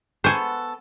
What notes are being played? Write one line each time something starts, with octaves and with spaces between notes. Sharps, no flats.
B3 A4 C5 G#5 C#6